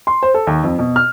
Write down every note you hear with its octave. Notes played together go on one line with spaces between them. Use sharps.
C6
C5
A4
D#2
F2
B2
F6